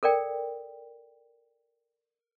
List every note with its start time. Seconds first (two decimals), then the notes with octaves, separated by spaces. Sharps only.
0.03 A4 A#4 D5 G5